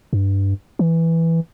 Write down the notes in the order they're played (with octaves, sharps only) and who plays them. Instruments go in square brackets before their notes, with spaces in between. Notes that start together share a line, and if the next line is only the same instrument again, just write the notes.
[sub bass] G2
E3